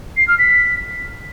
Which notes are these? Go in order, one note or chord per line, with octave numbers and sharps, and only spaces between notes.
C7
F6
B6